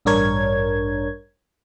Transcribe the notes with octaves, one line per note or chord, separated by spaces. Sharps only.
A1 G2 D4 A#4 C#5 G#6